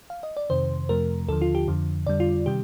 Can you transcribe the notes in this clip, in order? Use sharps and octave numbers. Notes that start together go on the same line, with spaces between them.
F5
D#5
D5
F2 C3 D#3 C5
F2 C3 F3 A3 A#4
D#2 D3 F3 A4
F4
G4
F2 D3 F3
F2 D3 G3 D5
F4
C3 D#3 G3 G4